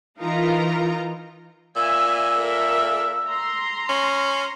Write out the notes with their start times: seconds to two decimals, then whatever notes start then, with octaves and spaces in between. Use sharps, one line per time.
0.19 E3 D#4 F4 A#4 A#5
1.76 A#2 E5 G#5 E6
2.38 A4 A#4 E5
3.29 A#5 C6
3.89 C#4